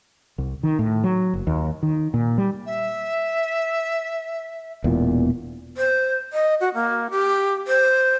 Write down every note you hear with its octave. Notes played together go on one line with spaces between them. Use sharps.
C2
D#3
A2
F#3
F#1
D#2
D#3
A#2
G3
E5
E1 E2 A#2
C5
D#5
F#4
A#3
G4
C5